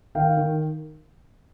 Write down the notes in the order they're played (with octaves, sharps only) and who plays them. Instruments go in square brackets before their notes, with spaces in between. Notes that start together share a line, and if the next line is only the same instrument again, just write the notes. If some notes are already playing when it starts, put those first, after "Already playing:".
[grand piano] D#3 F5 G5
D#3